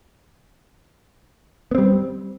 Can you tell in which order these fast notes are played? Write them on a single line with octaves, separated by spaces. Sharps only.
B3 C4 G3